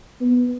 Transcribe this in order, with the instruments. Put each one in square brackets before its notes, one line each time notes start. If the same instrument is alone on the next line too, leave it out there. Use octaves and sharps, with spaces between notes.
[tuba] B3